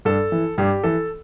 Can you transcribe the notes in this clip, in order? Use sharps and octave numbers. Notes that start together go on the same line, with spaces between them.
G2 A4
E3
G2 G4
E3 A4